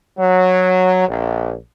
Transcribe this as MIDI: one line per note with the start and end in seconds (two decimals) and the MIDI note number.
0.18 1.04 54
1.08 1.55 34